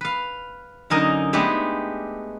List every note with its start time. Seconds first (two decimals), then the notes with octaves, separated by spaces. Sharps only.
0.01 B4 F5
0.90 F#2 D3 C#4 D#4 A#4 D#5
1.33 G#3 A3 B3 D4 G4